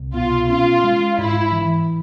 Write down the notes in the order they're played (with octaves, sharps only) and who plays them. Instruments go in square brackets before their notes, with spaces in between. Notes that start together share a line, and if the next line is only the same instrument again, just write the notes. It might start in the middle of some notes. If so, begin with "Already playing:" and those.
Already playing: [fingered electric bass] C2
[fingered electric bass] B2 [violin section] F4
[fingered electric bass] C#4 [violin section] F4
[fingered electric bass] G#3
[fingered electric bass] G#2 [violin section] E4
[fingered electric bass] E3